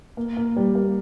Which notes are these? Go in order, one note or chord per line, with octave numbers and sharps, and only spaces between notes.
A#3
A#3
G3
A#3